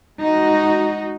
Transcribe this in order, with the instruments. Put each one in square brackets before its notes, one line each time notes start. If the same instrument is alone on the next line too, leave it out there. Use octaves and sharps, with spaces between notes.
[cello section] G#3 D#4 F#4